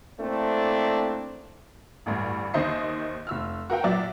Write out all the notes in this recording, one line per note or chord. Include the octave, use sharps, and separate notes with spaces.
A3 A#3 C4 D4 E4 A4
A1 D2 G2
D#2 D#3 C5 D#5 E5 C7
F1 E6 F6
F#4 A#4 F5 G5
A#2 F#3 D5 E5